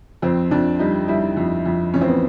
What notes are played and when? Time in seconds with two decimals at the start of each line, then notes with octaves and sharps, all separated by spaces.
0.22 F2 C4
0.51 F2 D4
0.79 G3 D#4
1.08 G3 E4
1.37 F2
1.65 F2
1.94 A1 C#4
2.01 C4
2.08 B3